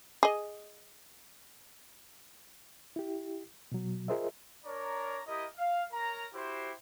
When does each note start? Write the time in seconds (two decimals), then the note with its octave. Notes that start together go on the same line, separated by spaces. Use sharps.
0.23 G#4 D#5
2.96 E4 G4
3.72 B2 F#3
4.08 F4 G#4 A#4 C5 D#5 E5
4.65 D4 A#4 C#5 D5 A#5
5.27 E4 G4 A#4 D#5
5.57 F5
5.93 A#4 C#5 A#5
6.34 E4 F#4 G4 C5